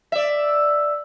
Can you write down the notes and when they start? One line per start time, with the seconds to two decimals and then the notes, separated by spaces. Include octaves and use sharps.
0.12 D5 E5